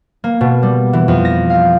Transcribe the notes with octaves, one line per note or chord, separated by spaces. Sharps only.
A#3
B2
G3
E3
F2
A#6
F5